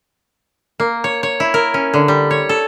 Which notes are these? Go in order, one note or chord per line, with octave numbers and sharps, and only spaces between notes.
A#3
C#5
C#5
E4
A#4
C#4
D3
G3
C#5
A4